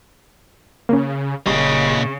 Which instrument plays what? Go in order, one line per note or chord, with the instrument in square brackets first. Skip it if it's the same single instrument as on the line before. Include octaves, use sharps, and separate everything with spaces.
[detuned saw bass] C#3 [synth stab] A#3 C#4
[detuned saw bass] F#1 [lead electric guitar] A#2 D#5 [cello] C#3 [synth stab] G3